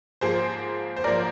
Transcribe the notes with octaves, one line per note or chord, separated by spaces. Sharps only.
G#2 F3 A#3 G#4 C5
C5
G#2 F3 A#3 A#4 D5